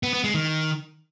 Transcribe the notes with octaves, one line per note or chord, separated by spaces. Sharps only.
B3
B3
G#3
D#3